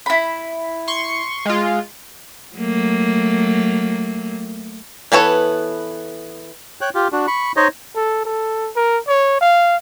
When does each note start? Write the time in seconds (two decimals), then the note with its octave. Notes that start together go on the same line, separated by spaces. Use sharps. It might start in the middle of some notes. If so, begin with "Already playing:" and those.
0.06 E4 B5
0.88 C6 C#6
1.45 G#3 F4
2.56 F#3 A3 A#3
5.12 E3 B3 A4 C#5
6.81 C#5 G5 F#6
6.95 F4 G4
7.12 D4 F#4
7.27 B5 C#6
7.56 D#4 C5 C#5 D#5
7.95 A4
8.25 A4
8.76 A#4
9.08 C#5
9.41 F5